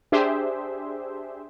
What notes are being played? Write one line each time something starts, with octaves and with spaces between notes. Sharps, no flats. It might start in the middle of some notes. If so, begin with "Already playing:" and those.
D4 G4 G#4 C5 E5